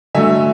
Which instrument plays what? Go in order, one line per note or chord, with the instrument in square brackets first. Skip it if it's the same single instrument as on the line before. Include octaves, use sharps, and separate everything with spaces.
[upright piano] D3 F#3 A3 E5 G#5